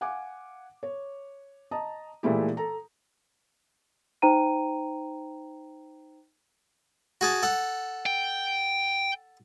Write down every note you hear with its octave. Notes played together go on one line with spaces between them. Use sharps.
F5 F#5 G#5 D6
C#5
D#5 A5 A#5 D#6
A#2 E3 G#3 A3 E4 G4
A4 A#5
D#4 C5 G5 A#5 D#7
F#4 G#4 A5
A4 F#5
G5